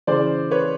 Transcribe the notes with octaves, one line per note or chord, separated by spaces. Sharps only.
C#3 E3 C5 D5
B4 C#5